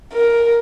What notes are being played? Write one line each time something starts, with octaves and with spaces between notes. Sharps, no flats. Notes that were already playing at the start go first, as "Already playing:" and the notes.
A#4